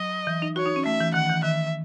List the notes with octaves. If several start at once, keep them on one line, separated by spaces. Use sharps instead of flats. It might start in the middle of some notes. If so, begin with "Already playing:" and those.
Already playing: F#3 D#5
E3
D#4
F#4 C#5
D#4
C#4
A3 E5
E3
D#3 F#5
E3
D#3 E5